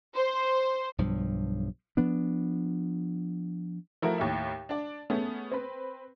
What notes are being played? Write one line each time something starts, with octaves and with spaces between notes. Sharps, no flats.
C5
B1 G2 F3
F3 B3 D4
F3 A3 E4 F#4 A#4
D#2 A2 E5
D4 D5
A3 B3 C#4 G#4
C4 B4